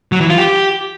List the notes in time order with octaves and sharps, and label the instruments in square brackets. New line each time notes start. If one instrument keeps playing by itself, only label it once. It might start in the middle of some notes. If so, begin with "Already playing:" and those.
[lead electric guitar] F#3
E3
F4
G4